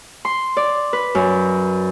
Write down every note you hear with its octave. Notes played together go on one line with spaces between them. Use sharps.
C6
D5
B4
F#2